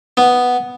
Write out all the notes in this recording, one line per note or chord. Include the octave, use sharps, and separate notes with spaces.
B3